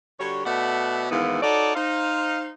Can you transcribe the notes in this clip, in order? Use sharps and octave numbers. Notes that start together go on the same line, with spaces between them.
D3 G3 F#4 C#5
B2 A3 D5 E5 F#5
G#2 D#3 E3 A#3 B3 E4
D#4 F#4 A4 C#5 D5
D#4 C5 F5